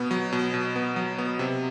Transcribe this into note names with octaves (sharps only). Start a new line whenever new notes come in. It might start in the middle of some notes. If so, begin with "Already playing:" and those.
Already playing: B2 B3
F#3
B2
B2
B3
F#3
B3
C3